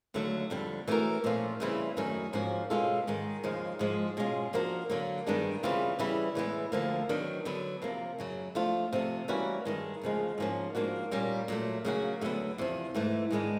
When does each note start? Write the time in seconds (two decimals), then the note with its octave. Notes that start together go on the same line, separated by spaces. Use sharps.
0.14 D#2 D3 F#3 A3
0.50 F2 D3 G3
0.88 E3 A3 C#4 F#4 A#4
1.24 A#2 F3 A3 C#4 F4
1.60 C#3 E3 G3 C4 E4
1.97 F#2 D#3 F#3 A3 C#4
2.33 G#2 F3 A#3 C#4 F#4
2.70 B2 G#3 C#4 F4 A4
3.07 G#2 D#3 G#3
3.44 D#2 C#3 F3 G#3
3.79 G#2 F3 G#3
4.17 B2 G#3 C#4 F4
4.53 F3 A#3 D4 F#4 A#4
4.90 D3 F#3 A#3
5.27 G2 D#3 G#3 B3 D4
5.63 C#3 E3 G3 C4 F4
5.99 C#3 E3 G3 B3 E4
6.35 A2 E3 G#3 B3
6.72 D2 D3 F3 A#3
7.09 D#3 F#3 B3 D4
7.45 D3 F#3 B3
7.82 C3 F3 A#3
8.18 F#2 C#3 F#3
8.55 F3 A3 D4 F4
8.93 C3 F3 A3
9.28 E3 G3 A#3 C#4 F#4
9.65 G2 D#3 G#3
10.02 D2 C#3 F3 G#3
10.38 G#2 F3 A#3 C#4
10.75 G#2 F3 A#3 D4 F#4
11.11 A#2 G3 A#3 C#4
11.48 A#2 F#3 A3
11.85 C#3 F#3 A#3 C#4 F#4
12.21 D2 D3 F#3 B3
12.58 E2 C3 F3
12.95 G#2 E3 A3
13.31 G#2 D#3 G#3 B3 D4